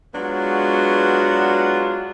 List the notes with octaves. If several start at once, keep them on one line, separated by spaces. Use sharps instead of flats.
F#3 G#3 B3 D4 F4 F#4